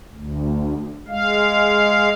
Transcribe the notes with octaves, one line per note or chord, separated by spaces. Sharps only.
D2
G#3 F5